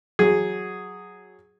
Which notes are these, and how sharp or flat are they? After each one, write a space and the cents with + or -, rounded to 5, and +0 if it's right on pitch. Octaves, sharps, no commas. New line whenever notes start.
F#3 +0 G#4 +0